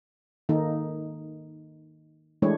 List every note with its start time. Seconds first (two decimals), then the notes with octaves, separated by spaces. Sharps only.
0.49 D#3 A#3 D#4 A4
2.42 E3 G#3 A3 D4 E4 C#5